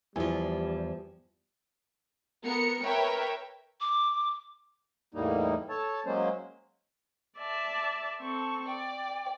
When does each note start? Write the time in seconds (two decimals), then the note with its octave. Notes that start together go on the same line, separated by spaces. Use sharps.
0.16 E2 F3 G3 E4 G#5
2.44 B3 A#4 C#7
2.83 A#4 B4 C#5 E5 G5
3.81 D6
5.14 E2 A2 G3 A#3 D#4
5.69 A4 C#5 A5
6.06 F#3 G#3 A#3 C#4 C5
7.38 D5 E5 A5
8.20 C4 A4 C#6
8.67 D5 G5